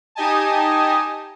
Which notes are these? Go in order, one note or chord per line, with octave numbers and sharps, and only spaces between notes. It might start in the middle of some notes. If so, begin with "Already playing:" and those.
D#4 G4 D#5 G#5 A5